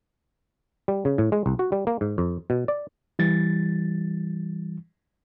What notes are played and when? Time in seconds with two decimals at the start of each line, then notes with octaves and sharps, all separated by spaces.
0.88 G3
1.05 C#3
1.18 A2
1.32 G#3
1.46 C2
1.59 F#4
1.72 G3
1.87 A#3
2.01 G#2
2.18 F2
2.50 B2
2.68 D5
3.19 E3 G3 A6